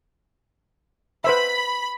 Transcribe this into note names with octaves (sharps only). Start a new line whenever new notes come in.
B4 C5 E5 B5